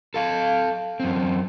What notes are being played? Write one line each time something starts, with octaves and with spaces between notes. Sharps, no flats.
A4 F5
F#2 C4